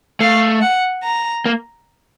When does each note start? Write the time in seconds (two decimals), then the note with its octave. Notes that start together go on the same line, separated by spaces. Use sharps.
0.21 A3 F5
0.62 F#5
1.03 A#5
1.46 A#3